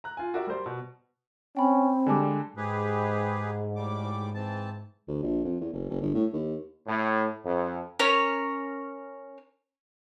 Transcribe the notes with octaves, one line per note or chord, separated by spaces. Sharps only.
A#5 F#6
F4 G#5
F#4 G4 A#4 D5 E5
G3 A#4 C5 D5
B2
C4 C#4 G5 B5
D3 G3 G#3 G#5 A5 D6
G#2 G4 G#4 B4
A2 G3 D6
E3 C4 A5
D2
A#1
F2
E2
F#1
F#1
G1
A2
D#2
A2
F2
C#4 A#4 C#5